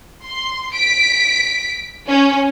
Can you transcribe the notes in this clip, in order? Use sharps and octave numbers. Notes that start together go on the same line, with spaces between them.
C6
B6 D7
C#4